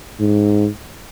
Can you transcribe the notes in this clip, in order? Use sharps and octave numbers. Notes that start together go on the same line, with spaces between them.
G#2